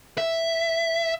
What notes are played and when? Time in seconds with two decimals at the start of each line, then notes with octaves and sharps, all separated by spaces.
0.18 E5